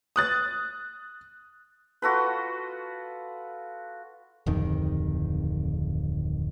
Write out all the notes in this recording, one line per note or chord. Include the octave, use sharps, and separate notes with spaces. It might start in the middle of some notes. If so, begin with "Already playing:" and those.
D#6 F#6 A6
F4 F#4 A4 B4
D1 F2 D#3